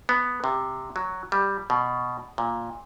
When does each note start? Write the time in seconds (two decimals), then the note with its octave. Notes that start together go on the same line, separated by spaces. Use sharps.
0.09 B3
0.44 C3
0.96 F#3
1.32 G3
1.70 B2
2.38 A#2